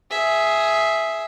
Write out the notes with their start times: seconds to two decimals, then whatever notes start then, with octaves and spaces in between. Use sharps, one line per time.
0.11 G#4 E5